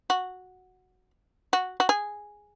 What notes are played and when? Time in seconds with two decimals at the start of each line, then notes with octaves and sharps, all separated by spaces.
0.10 F#4
1.53 F#4
1.80 F#4
1.89 G#4